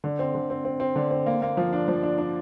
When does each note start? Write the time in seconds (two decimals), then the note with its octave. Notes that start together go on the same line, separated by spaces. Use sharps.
0.04 D3
0.19 C4
0.35 D3
0.50 C4
0.65 C4
0.80 C4
0.96 D3
1.11 C4
1.26 A#3
1.42 A#3
1.57 F3
1.73 D4
1.88 F3
2.03 D4
2.18 D4